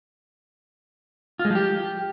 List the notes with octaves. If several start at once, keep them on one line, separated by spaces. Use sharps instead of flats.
F4
G#3
F3
G4